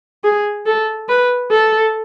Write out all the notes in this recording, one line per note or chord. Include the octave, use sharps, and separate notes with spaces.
G#4
A4
B4
A4